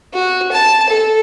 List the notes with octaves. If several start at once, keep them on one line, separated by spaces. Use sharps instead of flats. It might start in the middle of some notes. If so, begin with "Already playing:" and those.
F#4
A5
A4